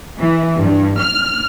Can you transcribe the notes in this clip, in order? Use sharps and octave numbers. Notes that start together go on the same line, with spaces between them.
E3
G2
F6